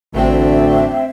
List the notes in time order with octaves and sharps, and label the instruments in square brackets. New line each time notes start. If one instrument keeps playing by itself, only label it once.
[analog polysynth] A1 A3 D4 [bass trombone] D2 [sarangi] C4 [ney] E5